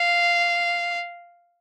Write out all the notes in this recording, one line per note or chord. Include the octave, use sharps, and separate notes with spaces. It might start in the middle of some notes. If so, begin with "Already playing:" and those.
Already playing: F5